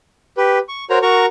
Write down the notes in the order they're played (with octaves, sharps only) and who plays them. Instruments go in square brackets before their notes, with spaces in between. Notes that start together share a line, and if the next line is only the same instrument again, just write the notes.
[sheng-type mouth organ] G4 B4
C#6
F#4 A#4 C5 C#5 A#5
F#4 A#4 A#5 C#6